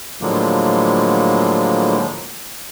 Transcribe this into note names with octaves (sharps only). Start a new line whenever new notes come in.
A2 D3 F3 F#3 G#3 A#3